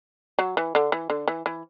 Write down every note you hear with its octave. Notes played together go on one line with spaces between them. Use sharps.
F#3
E3
D3
E3
D3
E3
E3